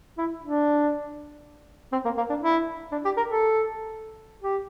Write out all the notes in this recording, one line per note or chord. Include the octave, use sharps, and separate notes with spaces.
E4
D4
C4
A#3
A#3
D4
E4
D4
G4
A#4
A4
G4